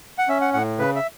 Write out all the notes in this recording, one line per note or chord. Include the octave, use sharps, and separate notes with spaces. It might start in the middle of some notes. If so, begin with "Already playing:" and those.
F#5
C#4 E5
F#5
A2 F#5
C#3 B4
E5